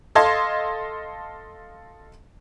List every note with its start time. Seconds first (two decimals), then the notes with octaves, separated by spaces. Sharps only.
0.15 A4 D#5 F5 A5 C6 G#6